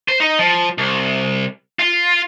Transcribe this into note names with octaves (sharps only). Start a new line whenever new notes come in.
C5
D#4
F3
C2
F4